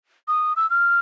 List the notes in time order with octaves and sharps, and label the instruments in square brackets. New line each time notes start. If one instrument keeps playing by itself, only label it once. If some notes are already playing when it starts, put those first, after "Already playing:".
[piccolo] D#6
E6
F6